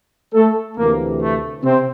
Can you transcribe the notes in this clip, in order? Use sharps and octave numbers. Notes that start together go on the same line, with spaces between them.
A3 A4
D2 C3 E3 A#3
A3
C3 C4